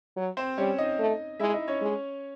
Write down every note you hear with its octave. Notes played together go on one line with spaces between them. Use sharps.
F#3
C4 C5
G3 C#4 C#5
D#4 D#5
A3
G#3 E4 E5
D#4 D#5
C#4 C#5
G#3